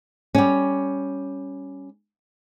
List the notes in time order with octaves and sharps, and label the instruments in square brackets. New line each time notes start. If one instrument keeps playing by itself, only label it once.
[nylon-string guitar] G3 C#4